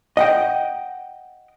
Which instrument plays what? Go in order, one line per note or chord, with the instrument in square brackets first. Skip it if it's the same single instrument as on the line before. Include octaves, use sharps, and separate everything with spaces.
[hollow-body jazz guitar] D#5 F#5 G5